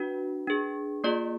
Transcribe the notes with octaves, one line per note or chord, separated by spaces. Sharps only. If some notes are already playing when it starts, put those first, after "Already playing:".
Already playing: D4 F#4 B4
D4 G#4
A#3 F4 G#4 D5